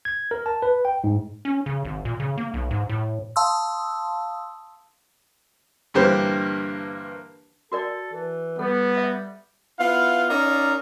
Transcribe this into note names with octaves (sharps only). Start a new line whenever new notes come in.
G#6
A#4
A5
B4
G5
G#2
C#4
C#3
G#1
A#2
C#3
A#3
B1
G#2
A2
F5 A5 C6 D#6 E6
G2 D3 E3 A#3 G4 C5
F#4 A4 A#4 D5
E3
G3 B3 A4
B4 E5
B3 E4 F4 F5 F#5
C#4 D#4 A#4 D5 F5